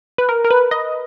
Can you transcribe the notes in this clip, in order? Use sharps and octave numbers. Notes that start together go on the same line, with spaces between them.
B4
A#4
A#4
B4
D#5